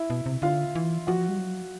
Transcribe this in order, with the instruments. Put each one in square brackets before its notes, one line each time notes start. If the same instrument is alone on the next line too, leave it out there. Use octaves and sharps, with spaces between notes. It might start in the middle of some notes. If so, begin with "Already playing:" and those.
Already playing: [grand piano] E4 E5
[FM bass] B2
C3
[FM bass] D3 [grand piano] F4 F5
[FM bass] E3
[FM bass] F3 [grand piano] F#4 F#5
[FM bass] G3
F#3